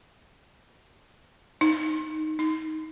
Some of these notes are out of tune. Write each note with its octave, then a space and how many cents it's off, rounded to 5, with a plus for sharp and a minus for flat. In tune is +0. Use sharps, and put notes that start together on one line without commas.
D#4 +5
D#4 +20